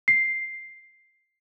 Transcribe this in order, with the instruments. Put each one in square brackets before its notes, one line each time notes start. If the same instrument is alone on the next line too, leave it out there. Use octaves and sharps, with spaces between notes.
[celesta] C7